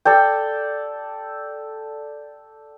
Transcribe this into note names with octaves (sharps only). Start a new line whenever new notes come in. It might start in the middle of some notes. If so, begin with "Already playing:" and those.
A4 D5 G5